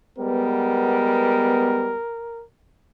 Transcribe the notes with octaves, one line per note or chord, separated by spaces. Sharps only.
G3 G#3 B3 A#4